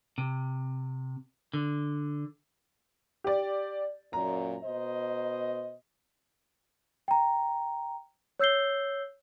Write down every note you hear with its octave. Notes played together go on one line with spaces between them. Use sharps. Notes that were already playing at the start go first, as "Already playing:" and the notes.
C3
D3
G4 D5
F#2 A#2 A#5
B2 C5 D#5
G5 A#5
C#5 E6 G6 C7 G7